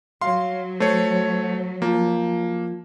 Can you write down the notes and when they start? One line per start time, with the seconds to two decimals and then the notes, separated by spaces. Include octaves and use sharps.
0.21 F#3 F5 C6
0.80 A3 C5 C#5
1.82 F3 A#3